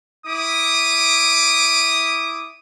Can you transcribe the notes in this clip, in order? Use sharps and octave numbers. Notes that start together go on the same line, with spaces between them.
E4 D6 D#6